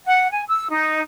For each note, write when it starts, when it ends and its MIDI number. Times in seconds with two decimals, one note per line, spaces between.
0.06 0.31 78
0.32 0.44 80
0.49 0.69 88
0.70 1.01 63